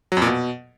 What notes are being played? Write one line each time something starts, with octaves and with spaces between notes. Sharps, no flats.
F#3
F2
A#2
B2